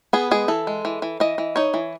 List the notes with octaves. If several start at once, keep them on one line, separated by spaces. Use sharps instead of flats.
B3 G#4
G#3 G#4
E3 A4
G#3
E3
E3
E3 D#5
E3
D#4 C#5
E3